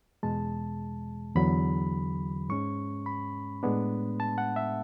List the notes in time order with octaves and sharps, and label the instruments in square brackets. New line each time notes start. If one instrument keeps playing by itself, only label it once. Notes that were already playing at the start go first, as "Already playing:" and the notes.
[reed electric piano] E2 B2 G#3 A5
E2 D3 F#3 B5
G#2 G#3 C#4 C#6
B5
A2 G#3 B3 D4
A5
F#5
E5